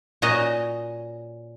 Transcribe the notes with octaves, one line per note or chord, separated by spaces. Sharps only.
A#2 C#4 F#4 D#5 A#5